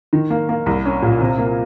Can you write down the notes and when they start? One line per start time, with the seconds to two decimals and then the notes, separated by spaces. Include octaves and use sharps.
0.13 D#3
0.30 A#3
0.49 A#3
0.66 C2
0.85 C#4
1.02 A#2
1.20 C3
1.38 A#3